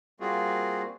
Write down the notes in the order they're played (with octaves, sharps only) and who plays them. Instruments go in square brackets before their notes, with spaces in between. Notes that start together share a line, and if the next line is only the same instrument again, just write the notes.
[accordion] G3 A#3 C4 F4 F#4 G#4